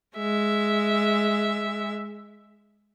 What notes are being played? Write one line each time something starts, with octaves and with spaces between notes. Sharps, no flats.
G#3 E5